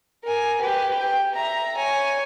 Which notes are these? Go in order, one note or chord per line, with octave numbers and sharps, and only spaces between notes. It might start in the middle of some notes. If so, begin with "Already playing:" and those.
A#4 G#5
G4 B4
G5
E5 A#5
C#5 G#5